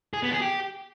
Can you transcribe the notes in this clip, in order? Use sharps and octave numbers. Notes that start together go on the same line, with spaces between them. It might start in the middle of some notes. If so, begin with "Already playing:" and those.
G#4
B3
G#4
G4